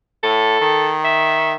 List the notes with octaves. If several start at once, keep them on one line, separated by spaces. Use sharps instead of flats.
A2 A4
D#3
E5